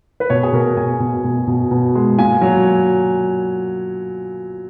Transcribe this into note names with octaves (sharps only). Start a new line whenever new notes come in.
B4
B2 C#5
G#4
B2 A#4
B2 G#5
B2
B2
B2
B2
G#3
A#2 G#5
F#3